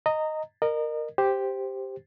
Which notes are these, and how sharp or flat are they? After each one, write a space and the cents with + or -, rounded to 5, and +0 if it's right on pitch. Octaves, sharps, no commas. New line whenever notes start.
D#5 +0 A#5 -20
A#4 -5 D#5 -35
G4 +0 C5 +0